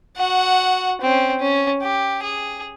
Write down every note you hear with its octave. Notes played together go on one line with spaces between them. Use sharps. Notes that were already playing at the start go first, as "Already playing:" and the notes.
F#4 F#5
C4 C#4
C#4
G4
G#4